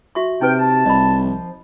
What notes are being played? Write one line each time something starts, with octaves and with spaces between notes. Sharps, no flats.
F#4 E5 C#6
C3 D#4 B4 G5
A5
C2 D#5 B5
F3